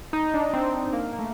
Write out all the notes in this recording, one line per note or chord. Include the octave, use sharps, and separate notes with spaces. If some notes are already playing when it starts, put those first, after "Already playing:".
D#4
D4
C4
C4
A#3
A#3
A3